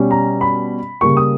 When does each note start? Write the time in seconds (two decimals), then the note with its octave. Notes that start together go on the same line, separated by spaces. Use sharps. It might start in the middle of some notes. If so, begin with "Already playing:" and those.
Already playing: B2 G3 C#4
0.11 A#5
0.41 B5
1.01 C#3 G3 A#3 C#6
1.17 D#6